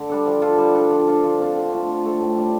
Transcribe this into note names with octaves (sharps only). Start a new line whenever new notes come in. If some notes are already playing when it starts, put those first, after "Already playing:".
Already playing: D3
G3 D4 A4
F3
D4 F4 A4
G3
D4 A4
F3
D4 F4 A4
F3
C4 F4 A4
D3
F3 A3 F4
F3
A3 C4 A4
A2
G3 D4 F4